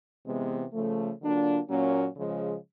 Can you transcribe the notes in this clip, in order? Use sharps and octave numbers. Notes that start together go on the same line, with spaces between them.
C3 E3 G#3 B3
C#3 F3 A3
D3 F#3 A#3 D4 F4
A#2 F#3 A#3 C#4
C#3 F3 G#3